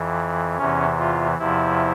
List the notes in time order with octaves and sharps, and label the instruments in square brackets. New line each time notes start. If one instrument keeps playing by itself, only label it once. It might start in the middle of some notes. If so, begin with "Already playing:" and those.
Already playing: [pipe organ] F2 E3
E2 C3 E3 C#4
F4
E2 C3 F3 E4